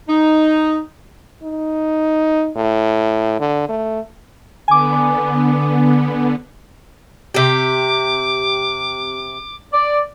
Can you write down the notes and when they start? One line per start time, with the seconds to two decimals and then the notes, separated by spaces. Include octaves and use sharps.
0.08 D#4
1.44 D#4
2.56 A2
3.40 D3
3.69 A3
4.68 D3 B3 G#5 D6
7.34 C3 G4 D6
9.72 D5